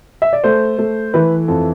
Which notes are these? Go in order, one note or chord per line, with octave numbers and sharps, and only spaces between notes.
E5
D5
A3 C5
A3
E3 B4
F2 A4